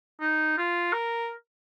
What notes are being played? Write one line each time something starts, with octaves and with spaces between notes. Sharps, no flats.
D#4
F4
A#4